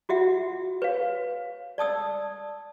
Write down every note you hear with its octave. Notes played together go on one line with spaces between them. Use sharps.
F4 F#4 E5 F#5
B4 C#5 F5
D5 A5 D#6 E6